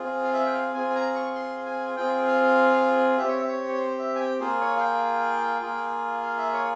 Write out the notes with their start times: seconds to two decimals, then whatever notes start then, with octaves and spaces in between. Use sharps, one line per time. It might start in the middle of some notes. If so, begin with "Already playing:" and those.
Already playing: C4 F4 G#4
0.23 F5
0.34 E5
0.46 G5
0.54 F5
0.74 C4 F4 G#4 G#5
0.90 G#5
0.95 A#5
1.15 C#6
1.35 C6
1.66 G#5
1.96 C4 F4 G#4 G5
2.27 F5
3.18 C4 G4 E5
3.28 C#5
3.36 E5
3.48 C#5
3.69 C#5
3.79 C5
3.99 E5
4.15 G#5
4.19 G5
4.39 A#3 F4 G#4 C5
4.61 C#5
4.77 F5
4.80 G5
5.62 A#3 F4 G#4
6.22 F5
6.38 E5
6.53 C#5